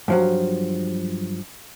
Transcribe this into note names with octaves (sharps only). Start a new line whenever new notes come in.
G2 F3 F#3